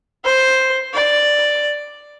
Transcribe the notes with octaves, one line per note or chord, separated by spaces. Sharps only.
C5
D5